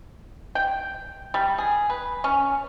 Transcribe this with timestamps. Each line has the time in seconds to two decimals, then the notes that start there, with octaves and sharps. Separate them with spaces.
0.55 G5
1.34 G3
1.58 G#4
1.90 B4
2.24 C#4